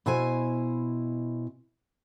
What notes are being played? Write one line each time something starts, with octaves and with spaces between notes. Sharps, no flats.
B2 E4 C5 G#5